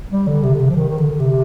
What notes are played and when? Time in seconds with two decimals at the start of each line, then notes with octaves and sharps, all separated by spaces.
0.11 G3
0.27 D3
0.43 C3
0.54 D3
0.59 C3
0.70 F3
0.76 D#3
0.88 D#3
0.98 D3
1.20 C3